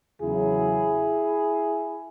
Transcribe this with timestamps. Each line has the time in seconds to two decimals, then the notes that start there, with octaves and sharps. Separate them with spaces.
0.20 E2 C#3 F#3 E4 G#4